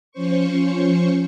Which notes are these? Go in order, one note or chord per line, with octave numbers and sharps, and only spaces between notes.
F3 C#4 C5 C#6